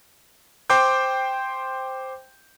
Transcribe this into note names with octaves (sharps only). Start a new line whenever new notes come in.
C5 G5 C6 D6 G6